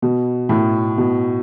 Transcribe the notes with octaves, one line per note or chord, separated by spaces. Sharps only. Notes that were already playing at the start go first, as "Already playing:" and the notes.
B2
A2
B2